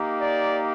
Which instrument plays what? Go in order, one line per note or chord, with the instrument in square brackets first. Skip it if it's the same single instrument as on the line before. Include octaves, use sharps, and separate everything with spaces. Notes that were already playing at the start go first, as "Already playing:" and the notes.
Already playing: [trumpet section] A#3 D#4 G4
D5